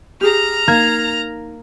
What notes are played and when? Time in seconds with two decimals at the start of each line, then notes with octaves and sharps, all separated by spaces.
0.21 G4 G#4 A#5 F6
0.68 A#3 D#4 G#6